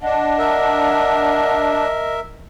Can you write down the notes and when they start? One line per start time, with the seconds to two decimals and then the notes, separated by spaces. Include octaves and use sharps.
0.01 D4 D#5 F#5
0.39 A#4 E5